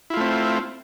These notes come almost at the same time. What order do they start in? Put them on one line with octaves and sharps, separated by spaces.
E4 F4 A3 C4